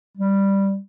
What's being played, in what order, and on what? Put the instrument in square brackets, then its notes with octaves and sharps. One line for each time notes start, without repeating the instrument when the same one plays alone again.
[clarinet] G3